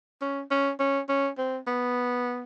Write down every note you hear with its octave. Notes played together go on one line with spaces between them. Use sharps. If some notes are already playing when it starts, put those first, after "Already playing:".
C#4
C#4
C#4
C#4
C4
B3